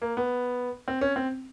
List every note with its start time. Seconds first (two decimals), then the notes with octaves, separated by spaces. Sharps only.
0.02 A#3
0.17 B3
0.88 C4
1.01 C#4
1.16 C4